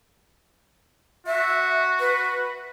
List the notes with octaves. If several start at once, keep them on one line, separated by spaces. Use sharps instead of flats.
F#4 E5
B4